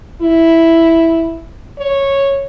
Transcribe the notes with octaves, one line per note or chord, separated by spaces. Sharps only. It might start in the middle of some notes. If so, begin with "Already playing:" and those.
E4
C#5